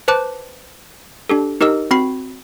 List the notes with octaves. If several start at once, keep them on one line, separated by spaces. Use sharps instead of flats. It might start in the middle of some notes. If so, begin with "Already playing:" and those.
B4 C5 A5 D6 F#6
D4 G4 A4
D#4 G4 A#4 D#5 E6
C4 F#4 B5 C7